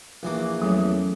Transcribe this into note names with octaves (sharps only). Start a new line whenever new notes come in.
A#1 E3 A#3
E2 F#3 A3 C#4